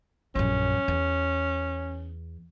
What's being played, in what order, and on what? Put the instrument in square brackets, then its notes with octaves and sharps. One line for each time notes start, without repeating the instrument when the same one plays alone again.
[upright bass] A#1 F#2 [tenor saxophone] C#4
[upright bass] E2